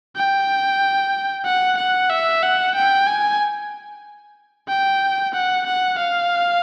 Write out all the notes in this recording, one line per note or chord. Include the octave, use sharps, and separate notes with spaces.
G5
F#5
F#5
E5
F#5
G5
G#5
G5
F#5
F#5
F5